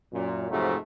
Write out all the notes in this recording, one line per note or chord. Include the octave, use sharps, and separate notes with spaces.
F#2 A#2
F2 G#2 C3 F#3 A3